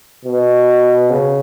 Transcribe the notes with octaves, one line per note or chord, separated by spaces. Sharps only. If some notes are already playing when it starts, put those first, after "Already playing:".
B2
C#3